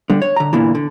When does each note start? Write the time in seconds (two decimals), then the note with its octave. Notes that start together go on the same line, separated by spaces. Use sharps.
0.10 D3 G3
0.22 C#5
0.36 D3 A#5
0.53 E2 A#2 D3 E3
0.75 D3